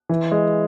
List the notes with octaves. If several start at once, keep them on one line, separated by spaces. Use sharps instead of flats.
E3
G#3